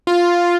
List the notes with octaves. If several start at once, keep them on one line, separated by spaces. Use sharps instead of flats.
F4